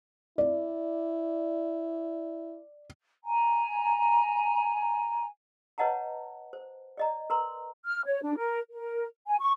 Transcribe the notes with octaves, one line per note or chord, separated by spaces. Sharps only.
E4 D5
G#5 A#5
B4 C#5 D#5 F#5 A5 A#5
C5
D5 D#5 A#5
A#4 B4 A#5 C6
F6
C#5
D4
A#4
A#4
G#5
C#6